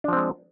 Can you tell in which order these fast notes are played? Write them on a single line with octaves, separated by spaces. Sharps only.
D4 F3 C4 G#3